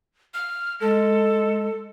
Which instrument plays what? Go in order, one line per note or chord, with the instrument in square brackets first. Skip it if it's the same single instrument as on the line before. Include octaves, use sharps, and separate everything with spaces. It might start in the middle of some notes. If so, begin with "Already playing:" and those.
[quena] F6
[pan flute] G#3 [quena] A4